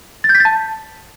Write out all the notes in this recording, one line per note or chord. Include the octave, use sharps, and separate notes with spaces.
A6
G6
B6
A6
A5